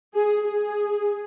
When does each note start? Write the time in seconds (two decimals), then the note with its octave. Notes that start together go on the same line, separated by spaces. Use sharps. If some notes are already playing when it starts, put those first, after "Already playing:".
0.15 G#4
0.46 G#4